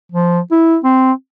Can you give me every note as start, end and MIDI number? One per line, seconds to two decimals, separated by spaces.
0.12 0.40 53
0.51 0.77 64
0.84 1.12 60